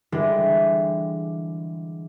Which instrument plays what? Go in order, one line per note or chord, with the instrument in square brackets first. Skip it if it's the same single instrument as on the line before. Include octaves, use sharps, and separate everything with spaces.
[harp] D3 E3 G3 G#3 D4